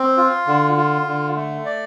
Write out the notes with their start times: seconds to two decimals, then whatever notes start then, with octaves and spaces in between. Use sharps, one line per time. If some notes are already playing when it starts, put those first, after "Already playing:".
Already playing: C4
0.17 F4
0.47 D3
0.77 F4
1.07 D3
1.36 A3
1.65 D5